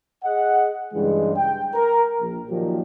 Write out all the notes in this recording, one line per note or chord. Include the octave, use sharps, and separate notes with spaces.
G#4 D#5 F#5
G2 C#3 E3 G#3
G5
A#4
A#1
A#2 D#3 F3 F#3 G4